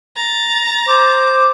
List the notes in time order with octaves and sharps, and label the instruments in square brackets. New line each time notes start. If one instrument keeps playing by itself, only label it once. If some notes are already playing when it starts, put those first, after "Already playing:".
[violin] A#5 A6
[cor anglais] C5 [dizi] D6